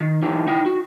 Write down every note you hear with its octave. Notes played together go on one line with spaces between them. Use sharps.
D#3
E3 D#4 G4
D#4 E4 G5
F#4